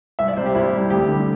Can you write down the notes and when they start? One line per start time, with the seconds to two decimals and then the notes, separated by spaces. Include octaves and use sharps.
0.19 C2 E5
0.28 D5
0.37 C3 G3 C5
0.46 G4
0.55 C2 E4
0.73 C3 G3
0.90 D2 G4
1.08 D3 G3